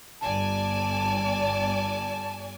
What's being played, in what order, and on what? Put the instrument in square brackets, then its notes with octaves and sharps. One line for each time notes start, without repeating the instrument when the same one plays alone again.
[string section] G1 D5 G#5 [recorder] A5